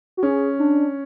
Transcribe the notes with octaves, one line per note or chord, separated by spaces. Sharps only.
F#4
C#4 G#4
D4